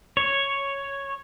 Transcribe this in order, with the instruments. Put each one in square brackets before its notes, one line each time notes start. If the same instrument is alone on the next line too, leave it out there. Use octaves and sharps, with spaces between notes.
[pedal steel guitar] C#5